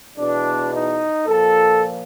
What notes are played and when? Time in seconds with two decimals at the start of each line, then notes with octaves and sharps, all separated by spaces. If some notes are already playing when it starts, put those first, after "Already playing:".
0.18 E2 B2 D4
0.72 D#4
1.27 A#2 F3 A4